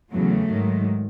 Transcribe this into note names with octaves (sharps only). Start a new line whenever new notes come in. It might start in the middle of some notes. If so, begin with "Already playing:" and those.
E2 C#3 F#3 A3
G#2 D#3 F#3